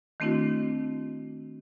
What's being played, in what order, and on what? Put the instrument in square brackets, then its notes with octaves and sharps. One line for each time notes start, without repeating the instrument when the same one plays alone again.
[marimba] D#3 A3 C4 D4 E4 F#4